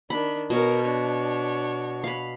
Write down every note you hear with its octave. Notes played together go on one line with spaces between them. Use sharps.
D#3 D4 B5
B2 A#4 C#5
D4 C#5
F5 B5